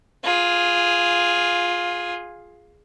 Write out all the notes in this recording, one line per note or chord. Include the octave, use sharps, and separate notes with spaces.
F4 G#4